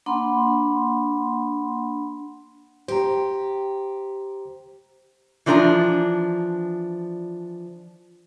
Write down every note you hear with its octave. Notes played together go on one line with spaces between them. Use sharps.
A#3 D4 F#5 B5 C6
G4 C5 A#5
E3 F3 D4 B4 A#5